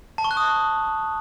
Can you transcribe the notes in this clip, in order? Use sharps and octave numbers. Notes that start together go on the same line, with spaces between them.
A5
C#6
F#6
D#6